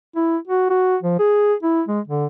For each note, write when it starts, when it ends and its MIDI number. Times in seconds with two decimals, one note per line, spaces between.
0.16 0.37 64
0.48 0.69 66
0.70 0.96 66
1.03 1.16 53
1.19 1.54 68
1.63 1.83 64
1.88 2.00 56
2.08 2.26 50